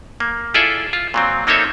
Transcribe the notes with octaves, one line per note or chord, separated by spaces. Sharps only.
A#3
E4 F4 G#4 A4 D5 E5
F4
A#2 F#3 C4
A#3 C4 D#4 A4 C#5 E5